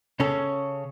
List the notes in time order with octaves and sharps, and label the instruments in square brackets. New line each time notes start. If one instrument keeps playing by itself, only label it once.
[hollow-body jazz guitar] C#3 C#4 A4